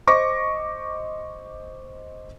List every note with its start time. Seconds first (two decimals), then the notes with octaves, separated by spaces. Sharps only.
0.07 C5 D#5 C#6 D6 A#6